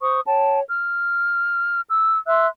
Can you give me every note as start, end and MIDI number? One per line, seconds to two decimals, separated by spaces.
0.01 0.20 72
0.01 0.20 85
0.01 0.20 87
0.26 0.61 73
0.26 0.61 79
0.26 0.61 81
0.69 1.81 89
1.88 2.17 88
2.28 2.47 76
2.28 2.47 84
2.28 2.47 88
2.28 2.47 90